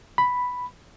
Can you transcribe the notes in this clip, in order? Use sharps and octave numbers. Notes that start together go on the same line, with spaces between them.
B5